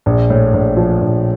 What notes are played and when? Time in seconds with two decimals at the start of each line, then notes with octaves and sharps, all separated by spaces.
0.06 A#1
0.30 A2
0.54 A#1
0.77 F3
1.01 A#1